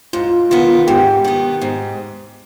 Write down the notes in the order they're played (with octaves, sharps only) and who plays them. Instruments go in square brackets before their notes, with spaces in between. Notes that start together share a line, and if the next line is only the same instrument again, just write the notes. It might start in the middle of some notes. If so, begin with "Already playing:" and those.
[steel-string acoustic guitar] G#2 [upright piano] F4
[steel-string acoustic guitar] D#3 B3 [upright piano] F4
[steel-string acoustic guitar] G#2 [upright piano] G4
[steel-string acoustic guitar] D#3 B3
G#2